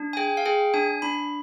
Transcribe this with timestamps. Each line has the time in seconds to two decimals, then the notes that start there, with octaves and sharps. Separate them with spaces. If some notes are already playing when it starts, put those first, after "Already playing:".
Already playing: D4
0.13 G#5
0.17 G#4 G5
0.37 F5
0.45 G#4 G5
0.74 D4 G#5
1.02 D4 B5